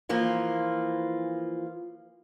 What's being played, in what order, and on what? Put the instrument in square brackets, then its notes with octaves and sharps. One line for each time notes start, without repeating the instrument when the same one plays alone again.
[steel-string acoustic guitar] E3 F3 A#3 F4